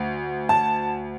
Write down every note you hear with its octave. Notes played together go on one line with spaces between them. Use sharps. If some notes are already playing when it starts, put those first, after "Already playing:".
Already playing: D2
A5